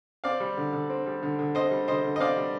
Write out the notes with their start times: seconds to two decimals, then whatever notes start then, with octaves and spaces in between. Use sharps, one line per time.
0.24 C4 D5 F5
0.40 G3
0.57 D3
0.73 D3
0.90 C4
1.06 G3
1.23 D3
1.39 D3
1.55 C4 C5 D#5
1.71 G3
1.88 D3 C5 D#5
2.04 D3
2.16 D#5
2.20 C4 D5 F5
2.36 G3